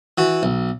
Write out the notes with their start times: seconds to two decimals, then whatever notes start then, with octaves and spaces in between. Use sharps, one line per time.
0.18 E3 F#4
0.43 B1